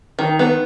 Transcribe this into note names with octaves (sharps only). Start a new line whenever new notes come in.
D#3
B3